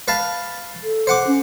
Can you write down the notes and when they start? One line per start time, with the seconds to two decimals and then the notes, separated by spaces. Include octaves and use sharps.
0.08 B4 F5 A5
0.84 A4
1.07 C5 F#5 D6
1.27 C#4